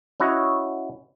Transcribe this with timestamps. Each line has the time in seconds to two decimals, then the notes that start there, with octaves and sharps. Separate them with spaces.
0.20 C#4 E4 F#4 C#5 D#5